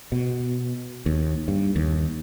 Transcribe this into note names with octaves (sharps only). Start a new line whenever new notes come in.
B2
D#2
G2
D#2